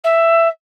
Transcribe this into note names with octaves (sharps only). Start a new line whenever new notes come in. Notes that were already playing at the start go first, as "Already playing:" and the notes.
E5